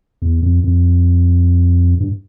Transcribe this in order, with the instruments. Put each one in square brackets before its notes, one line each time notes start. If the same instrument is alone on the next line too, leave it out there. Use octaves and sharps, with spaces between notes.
[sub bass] E2
F2
F2
G2